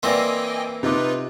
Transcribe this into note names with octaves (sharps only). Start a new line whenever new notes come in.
E3 A#3 C4 D5 D#5 G5 G#5 C6
C3 D#4 F4 B4 D#5 D6